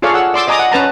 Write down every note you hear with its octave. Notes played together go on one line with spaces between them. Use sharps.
F4 G#4 A4 C#5 D5 F5
F#5 E6
D5 C6 D6 E6
D5 D#5 G#5 A#5 D6 D#6
F#5
C#4 B4 A5 A#5